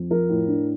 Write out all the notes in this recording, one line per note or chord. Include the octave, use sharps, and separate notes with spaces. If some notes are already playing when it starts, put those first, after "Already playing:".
Already playing: F2
F3 A#4
A2
D4